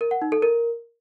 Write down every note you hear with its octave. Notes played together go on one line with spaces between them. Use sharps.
A#4
F#5
D#4
A4
A#4